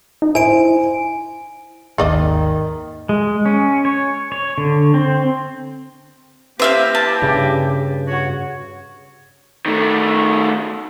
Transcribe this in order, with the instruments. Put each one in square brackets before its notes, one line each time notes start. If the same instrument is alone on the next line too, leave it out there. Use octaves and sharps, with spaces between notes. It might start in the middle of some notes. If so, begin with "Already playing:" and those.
[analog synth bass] D#4
[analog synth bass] E4 [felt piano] C5 [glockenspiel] G#5 D7
[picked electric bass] G#1 D#2 [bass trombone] D#3 [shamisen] A#3 D5 D#5
[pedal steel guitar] G#3
C#4
C#5
C#5
D3
C4
[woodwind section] E3 A#3 G4 [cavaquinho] C5 E5 F5
[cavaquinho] A5
[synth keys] G2 C#3
[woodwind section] F#4 C#5
[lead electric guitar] D#3 A3